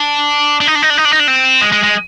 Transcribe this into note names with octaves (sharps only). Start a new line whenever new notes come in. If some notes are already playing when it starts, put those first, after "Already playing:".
Already playing: D4
D4
D#4
D4
D#4
D4
D#4
D4
D#4
D4
C4
G#3
G#3
G#3